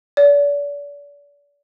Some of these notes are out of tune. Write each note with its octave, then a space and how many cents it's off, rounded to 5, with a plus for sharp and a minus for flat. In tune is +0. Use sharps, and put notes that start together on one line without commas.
D5 -35